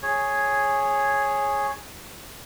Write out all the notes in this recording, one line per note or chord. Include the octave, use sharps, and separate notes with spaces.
G#4 C#5